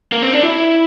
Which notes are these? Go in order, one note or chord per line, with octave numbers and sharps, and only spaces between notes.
A#3
C4
D4
E4